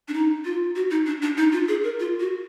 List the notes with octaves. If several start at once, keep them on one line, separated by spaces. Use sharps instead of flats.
D4
D#4
F4
F#4
D#4
D4
D4
D#4
F4
G#4
A#4
F4
F#4